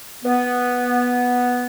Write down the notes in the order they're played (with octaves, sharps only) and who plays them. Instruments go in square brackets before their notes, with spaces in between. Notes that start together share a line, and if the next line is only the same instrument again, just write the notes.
[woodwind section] B3